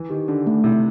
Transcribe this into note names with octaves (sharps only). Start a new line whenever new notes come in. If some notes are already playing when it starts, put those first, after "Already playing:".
Already playing: E3
D#3 G4
D3 D4
A3
C3 E4